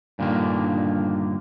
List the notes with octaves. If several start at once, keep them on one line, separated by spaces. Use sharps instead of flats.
G2 A#2 D3 D#3 A#3